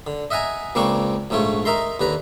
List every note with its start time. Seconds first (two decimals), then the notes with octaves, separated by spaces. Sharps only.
0.07 D3
0.30 D#5 E5 F#5 G#5 A#5
0.75 C#2 A#3 C4 D4 C#6
1.30 A#1 G#2 A3 F4 C#5
1.65 D#4 A#4 E5 A#5 C6
2.00 D#2 D3 B4 A#5